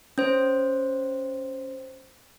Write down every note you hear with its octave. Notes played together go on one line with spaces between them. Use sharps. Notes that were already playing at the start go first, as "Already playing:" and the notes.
C#4 C5